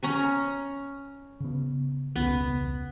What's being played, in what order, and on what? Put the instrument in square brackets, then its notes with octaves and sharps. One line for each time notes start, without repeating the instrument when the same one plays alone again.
[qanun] C#4 A#5 C#6
[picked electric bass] C#3 B3
[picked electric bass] E1 C#2 C#4 [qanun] B3